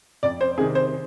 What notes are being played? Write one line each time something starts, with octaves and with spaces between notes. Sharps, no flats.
F2 D5
C5
C3 D#3 G#4
C5